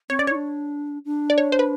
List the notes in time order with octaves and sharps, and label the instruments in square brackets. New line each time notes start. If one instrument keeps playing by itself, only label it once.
[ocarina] C4 [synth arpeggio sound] C#5
[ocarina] C#4 [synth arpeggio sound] D5
[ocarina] E4 [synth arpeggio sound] C#5
[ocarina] D4
D4
[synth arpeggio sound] D5
C#5
C5
B4